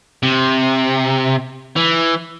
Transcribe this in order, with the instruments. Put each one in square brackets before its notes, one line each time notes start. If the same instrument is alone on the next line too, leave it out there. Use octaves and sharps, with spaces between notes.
[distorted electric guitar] C3
E3